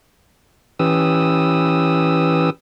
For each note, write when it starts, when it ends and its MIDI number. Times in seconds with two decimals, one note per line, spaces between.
0.79 2.50 52
0.79 2.50 61
0.79 2.50 67
0.79 2.50 71
0.79 2.50 87
0.79 2.50 88